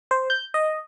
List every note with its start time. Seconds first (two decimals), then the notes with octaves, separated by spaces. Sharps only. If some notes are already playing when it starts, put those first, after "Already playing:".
0.11 C5
0.30 G6
0.54 D#5